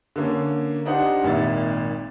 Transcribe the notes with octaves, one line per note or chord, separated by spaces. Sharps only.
D3 A#3 C#4
D4 D#4 G4 C5 F#5
G#1 A#2 D#3 E5 A6